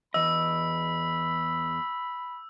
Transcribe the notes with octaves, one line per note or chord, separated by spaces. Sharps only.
E2 D#5 B5 E6